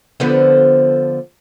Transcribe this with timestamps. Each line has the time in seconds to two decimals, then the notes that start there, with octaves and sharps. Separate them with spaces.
0.20 D3 F3 B3